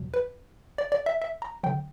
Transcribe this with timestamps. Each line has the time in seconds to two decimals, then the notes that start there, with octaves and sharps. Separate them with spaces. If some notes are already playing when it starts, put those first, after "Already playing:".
Already playing: E2 B2 F#3
0.14 B4
0.78 D5
0.92 D5
1.06 E5
1.22 E5
1.42 A#5
1.64 F#3 G5
1.67 D3